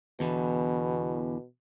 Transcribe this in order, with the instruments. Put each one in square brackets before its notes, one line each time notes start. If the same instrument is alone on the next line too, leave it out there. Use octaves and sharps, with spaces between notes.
[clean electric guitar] E2 D3 E3 [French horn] B2